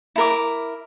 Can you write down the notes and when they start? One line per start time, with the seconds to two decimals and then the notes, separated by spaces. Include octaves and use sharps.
0.16 E4 A#4 D6